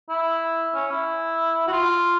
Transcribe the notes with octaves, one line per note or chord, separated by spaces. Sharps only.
E4
C#4
E4
F#4
F4